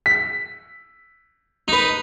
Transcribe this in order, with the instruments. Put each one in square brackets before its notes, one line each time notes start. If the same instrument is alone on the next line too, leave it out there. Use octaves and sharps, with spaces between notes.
[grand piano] B6
[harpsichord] D#4 B4